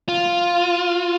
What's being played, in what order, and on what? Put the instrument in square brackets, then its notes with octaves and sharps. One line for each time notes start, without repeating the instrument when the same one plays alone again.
[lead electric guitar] F4